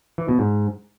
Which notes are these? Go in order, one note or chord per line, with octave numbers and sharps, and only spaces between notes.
E3
B2
G#2